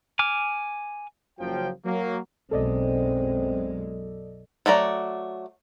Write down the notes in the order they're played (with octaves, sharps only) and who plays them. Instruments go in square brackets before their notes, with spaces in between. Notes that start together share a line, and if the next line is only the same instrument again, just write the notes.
[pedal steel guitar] G#5 D6 F6
[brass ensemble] F#1 F3 F#3 G5
F#3 A#3
[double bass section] B1 F#2 G#3 [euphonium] C4 [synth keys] A4 D5 D#5
[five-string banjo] F#3 A3 D5 A#5